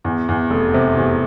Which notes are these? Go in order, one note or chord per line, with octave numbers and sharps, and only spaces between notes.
E2
E2
F1
C3
E2